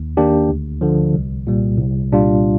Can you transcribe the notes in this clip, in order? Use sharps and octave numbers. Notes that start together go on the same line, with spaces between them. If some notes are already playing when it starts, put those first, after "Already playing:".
Already playing: D#2
D#3 A#3 D4 G4
D2
D3 F3
C2
A#2 G3
C2
A#2 G3 D4 F4